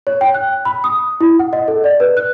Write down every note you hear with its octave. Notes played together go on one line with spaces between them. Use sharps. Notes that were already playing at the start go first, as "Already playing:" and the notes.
C#5
G5
F#6
B5
D#6
E4
F#5
D#5
A4
D5
B4
F#6